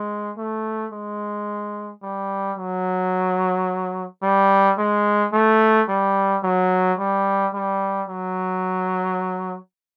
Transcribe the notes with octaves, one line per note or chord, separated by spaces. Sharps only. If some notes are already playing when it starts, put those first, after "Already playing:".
Already playing: G#3
A3
G#3
G3
F#3
G3
G#3
A3
G3
F#3
G3
G3
F#3